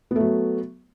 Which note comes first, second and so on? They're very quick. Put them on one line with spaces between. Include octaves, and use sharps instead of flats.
B3 A3 F#3